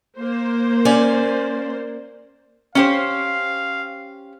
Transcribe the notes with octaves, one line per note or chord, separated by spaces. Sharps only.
A#3 C5
C#4 D5 G#5
C#4 G4 C5 F5